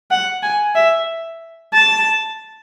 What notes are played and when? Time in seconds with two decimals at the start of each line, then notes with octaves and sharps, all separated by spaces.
0.11 F#5
0.43 G#5
0.75 E5
1.74 A5